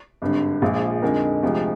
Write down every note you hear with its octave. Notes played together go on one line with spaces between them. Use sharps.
G#1 G2 D3
A#1 A#2 F3 G#3
F2 D3 G#3 D#4 A#4
D2 C3 F3 G#3